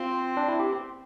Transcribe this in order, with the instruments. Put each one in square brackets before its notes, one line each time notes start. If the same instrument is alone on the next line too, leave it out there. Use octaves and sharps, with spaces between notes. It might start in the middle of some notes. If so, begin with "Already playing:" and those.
Already playing: [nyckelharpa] C4 [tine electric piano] F4
[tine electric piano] D4
E4
G4